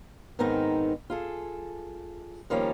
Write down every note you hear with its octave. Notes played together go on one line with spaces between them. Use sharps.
G#2 D#3 B3 C4 D#4 A#4
F4 G#4 A4
D#3 F3 G3 A#3 C#4